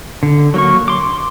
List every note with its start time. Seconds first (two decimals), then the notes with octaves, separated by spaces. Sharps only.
0.23 D3
0.54 F#3 A#3 C#6
0.88 C6 D6